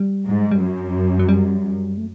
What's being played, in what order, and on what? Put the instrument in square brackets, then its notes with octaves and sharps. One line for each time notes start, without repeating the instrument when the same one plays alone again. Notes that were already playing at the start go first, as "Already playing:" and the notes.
Already playing: [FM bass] G3
[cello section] G#2
[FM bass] G3
[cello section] F#2 [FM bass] F#3
[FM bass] F#3
G3
A3